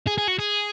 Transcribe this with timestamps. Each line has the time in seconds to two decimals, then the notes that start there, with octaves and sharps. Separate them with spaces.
0.07 G#4
0.18 G#4
0.28 F#4
0.39 G#4